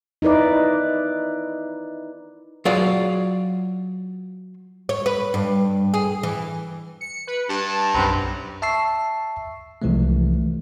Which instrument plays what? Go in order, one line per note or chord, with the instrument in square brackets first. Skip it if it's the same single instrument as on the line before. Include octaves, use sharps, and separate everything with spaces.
[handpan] D#4 E4 B4 D5
[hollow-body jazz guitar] F#3 F4 G#4 D5 F5
[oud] C#5
B4
G2
G#4
E3
[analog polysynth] C#7
B4
[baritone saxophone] G2 [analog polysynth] A5
[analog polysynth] B1 F#2 [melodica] C4 B4 A#5
[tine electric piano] E5 A5 C#6 E6 C7
C2 C3 E3 F3 G#3 A3